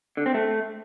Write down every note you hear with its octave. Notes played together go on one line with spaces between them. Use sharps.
D3
C4
A3